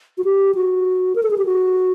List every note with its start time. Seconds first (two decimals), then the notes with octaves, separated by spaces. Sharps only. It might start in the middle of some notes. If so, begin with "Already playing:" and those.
0.18 F#4
0.24 G4
0.55 F#4
1.16 A#4
1.23 A4
1.31 G#4
1.38 G4
1.45 F#4